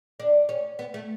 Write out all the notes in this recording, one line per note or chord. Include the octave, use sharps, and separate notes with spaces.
D4
C#4
B3
A3